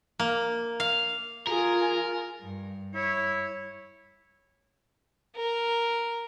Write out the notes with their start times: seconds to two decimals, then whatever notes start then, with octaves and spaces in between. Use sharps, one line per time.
0.19 A#3
0.80 F5
1.47 F4 G#4 A#4 G#5
2.41 G2
2.95 E4 C#5
5.36 A#4